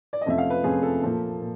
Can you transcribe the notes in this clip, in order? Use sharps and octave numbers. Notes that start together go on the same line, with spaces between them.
D5
D#5
F2 C3 F3 A3 C#4 E5
F5
B4
F2 C3 F3 A3 C#4 G#4
A4
A#2 F3 A#3
A#2